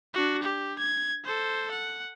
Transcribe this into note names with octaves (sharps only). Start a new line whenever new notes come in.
D4 F#4
G4
G#6
A4 C5
F#5